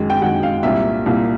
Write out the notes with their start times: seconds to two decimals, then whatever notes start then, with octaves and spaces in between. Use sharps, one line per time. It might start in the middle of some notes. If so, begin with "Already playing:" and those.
Already playing: F#2 D#3 G#3
0.10 G5
0.22 F#2 D#3 G#3 F#5
0.43 F5
0.63 C2 A#2 G3 A#3 E5
1.06 C2 A#2 G3 A#3